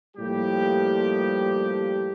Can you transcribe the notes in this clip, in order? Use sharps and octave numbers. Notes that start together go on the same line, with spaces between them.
A2 F3 G3 A#3 G4